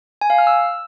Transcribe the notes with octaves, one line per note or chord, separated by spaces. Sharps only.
G#5
F5
F6
E6